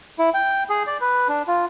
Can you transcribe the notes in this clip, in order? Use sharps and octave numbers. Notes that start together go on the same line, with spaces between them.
E4
G5
G#4
D5
B4
D4
F4